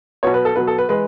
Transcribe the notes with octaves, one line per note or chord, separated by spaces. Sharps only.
B2 F#3 B3 C#5
B4
A4
B2 F#3 B3 B4
A4
B4
E3 G#3 B4